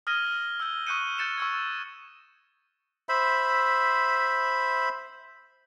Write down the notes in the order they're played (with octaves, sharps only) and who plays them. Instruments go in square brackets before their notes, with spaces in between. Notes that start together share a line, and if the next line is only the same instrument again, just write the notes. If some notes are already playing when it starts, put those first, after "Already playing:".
[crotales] D#6 F6 G#6 A#6 D#7 G7
E6 F6 G6 G7
C#6 D#6 F#6 G6 C#7 D#7
F#6 G6 A6 C#7 E7
C#6 E6 G#6
[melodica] C5 E5 B5